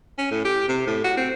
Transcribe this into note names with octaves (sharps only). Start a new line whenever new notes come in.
C#4
A2
G4
C3
A2
F#4
C4